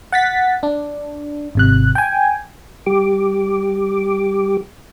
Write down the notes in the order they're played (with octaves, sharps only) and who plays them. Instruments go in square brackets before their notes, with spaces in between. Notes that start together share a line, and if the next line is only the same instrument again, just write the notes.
[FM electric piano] F#5 A6 B6
D4
G#1 C3 F#6
G5 G#5
[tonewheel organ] G3 G4 D6